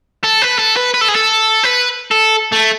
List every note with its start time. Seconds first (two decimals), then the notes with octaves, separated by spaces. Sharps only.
0.24 A4
0.42 B4
0.59 A4
0.76 B4
0.94 B4
1.01 A4
1.08 G#4
1.15 A4
1.64 B4
2.11 A4
2.52 A3